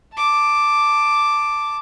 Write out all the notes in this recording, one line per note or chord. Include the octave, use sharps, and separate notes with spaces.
A5 D6